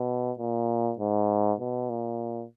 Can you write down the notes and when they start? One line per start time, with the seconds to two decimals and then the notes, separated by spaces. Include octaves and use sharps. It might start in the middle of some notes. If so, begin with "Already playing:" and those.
Already playing: B2
0.39 A#2
0.99 G#2
1.60 B2
1.90 A#2